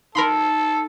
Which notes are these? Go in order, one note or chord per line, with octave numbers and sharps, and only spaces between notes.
D#4 A4 A#4 B5 C6